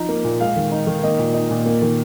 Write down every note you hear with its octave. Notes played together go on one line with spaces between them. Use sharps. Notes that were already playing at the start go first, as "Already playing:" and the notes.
Already playing: F3 D#4 A#5
A#3
A#2
G#3 F5
D#3
D#4
D#3
A#3 D#5
A#2
D#4 D#5
A#2
A#3
D#3